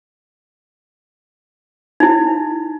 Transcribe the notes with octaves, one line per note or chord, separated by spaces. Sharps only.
D#4 E4